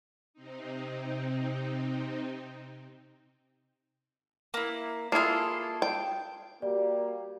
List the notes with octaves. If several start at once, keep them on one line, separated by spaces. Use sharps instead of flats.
C3 C4 D#4
A#3 E4
A#3 E4 F4 G#4 A4
G5
G3 A#3 F#4 G4 D5